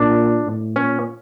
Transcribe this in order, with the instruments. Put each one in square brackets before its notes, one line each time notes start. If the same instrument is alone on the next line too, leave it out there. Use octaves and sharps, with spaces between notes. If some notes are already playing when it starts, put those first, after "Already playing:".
Already playing: [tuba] A#2 [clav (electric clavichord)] D4
[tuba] A2
[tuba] A#2 [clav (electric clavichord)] C#4